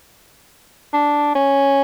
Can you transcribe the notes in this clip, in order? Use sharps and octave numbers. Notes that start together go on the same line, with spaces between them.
D4
C#4